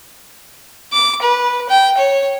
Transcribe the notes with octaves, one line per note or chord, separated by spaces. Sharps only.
D6
B4
G5
C#5